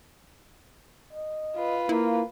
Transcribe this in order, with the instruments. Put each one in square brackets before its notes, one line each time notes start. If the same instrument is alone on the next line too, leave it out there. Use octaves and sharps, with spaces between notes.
[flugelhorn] D#5
[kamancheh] F4 B4
[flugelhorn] A#3 [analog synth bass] E4